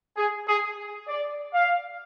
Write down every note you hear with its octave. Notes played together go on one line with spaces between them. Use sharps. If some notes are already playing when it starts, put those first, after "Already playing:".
G#4
G#4
D5
F5